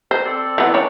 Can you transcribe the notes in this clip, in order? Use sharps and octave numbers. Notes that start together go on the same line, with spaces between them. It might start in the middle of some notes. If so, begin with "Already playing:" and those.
C5
C4 A4 D5
E3 B3
D4 D#4 C#5 D6